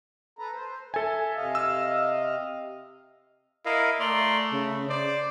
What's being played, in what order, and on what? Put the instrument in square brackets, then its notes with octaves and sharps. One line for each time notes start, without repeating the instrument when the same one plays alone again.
[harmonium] A4 B4 A#5
C5
[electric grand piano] A4 G#5 [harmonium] E5
[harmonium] C3 D#5 F5
[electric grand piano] E6
[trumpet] E4 [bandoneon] A#4 D#5 F5
[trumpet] A3 [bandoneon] D5 A#5 C6
[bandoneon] C#3
[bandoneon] C5 [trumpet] D5